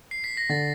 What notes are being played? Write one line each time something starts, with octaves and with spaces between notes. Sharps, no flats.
C7
B6
A#6
D3 A6